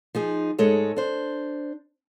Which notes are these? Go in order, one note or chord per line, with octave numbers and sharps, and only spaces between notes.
F3 D#4 G#4
G#2 G#3 A4 C#5
D4 C5